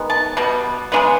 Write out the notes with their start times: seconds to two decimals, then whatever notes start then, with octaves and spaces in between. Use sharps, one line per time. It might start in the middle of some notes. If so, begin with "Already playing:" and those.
Already playing: D#3 G#3 B3
0.10 A5
0.37 B2 G3 B3
0.92 C#3 E3 G#3 B3